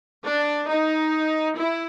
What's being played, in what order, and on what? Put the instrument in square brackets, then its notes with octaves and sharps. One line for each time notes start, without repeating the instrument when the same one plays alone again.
[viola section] D4
D#4
E4